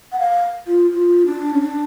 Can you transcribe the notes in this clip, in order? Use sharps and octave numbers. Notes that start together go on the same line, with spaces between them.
F#5
F5
F4
F4
D4
C#4
D4